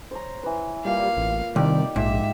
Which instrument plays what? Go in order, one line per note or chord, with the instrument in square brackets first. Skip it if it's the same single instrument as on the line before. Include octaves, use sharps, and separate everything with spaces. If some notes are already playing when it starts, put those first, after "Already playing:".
[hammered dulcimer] C5 C#5 A#5
E3 B4
[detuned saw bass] G3 [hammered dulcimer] A#3 F4 [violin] F5
[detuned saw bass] A1
[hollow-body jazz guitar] C2 [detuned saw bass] D#3 [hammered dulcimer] D#4 G4 [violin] D5
[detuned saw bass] A#1 [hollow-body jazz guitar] G#2 [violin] E5